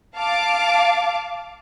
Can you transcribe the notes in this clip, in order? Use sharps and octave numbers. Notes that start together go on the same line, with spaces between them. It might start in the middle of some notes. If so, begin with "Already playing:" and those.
F5 A5 D6